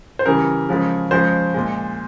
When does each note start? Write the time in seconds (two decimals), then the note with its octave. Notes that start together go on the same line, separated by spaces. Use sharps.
0.19 C5
0.26 C#3 E3 G3 A#4
0.69 C#3 F3 G#3
1.11 C#3 F3 G#3 C5
1.54 A#2 G#3